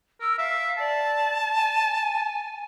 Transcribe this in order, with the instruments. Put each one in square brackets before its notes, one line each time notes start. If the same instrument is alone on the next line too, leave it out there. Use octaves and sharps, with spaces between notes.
[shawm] A#4 [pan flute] E6
[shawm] E5 [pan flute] F5
[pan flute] D5 [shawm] A5
[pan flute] G#5